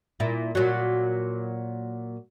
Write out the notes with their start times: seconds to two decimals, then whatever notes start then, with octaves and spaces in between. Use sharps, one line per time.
0.20 A#2 E4
0.55 A#2 F#3